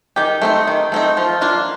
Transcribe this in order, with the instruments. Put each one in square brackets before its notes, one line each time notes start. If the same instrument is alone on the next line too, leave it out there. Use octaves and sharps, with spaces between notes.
[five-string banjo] D#3 G4
A3 C4 D#4
D#3
A3 C4 D#4
F3 F4
A#3 D4 F4